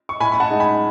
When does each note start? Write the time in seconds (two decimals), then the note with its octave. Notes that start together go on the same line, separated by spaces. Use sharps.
0.09 C#6
0.20 A2 G#5 B5
0.32 B5
0.40 F#5 A5
0.50 G#3 D#4
0.60 G#5 B5